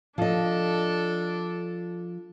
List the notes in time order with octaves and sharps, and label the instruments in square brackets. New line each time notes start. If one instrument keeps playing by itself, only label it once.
[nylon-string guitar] F3 D#5 [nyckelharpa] D4 A4